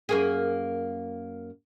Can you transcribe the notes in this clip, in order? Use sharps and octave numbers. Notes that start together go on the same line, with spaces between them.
F#2 A#3 G#4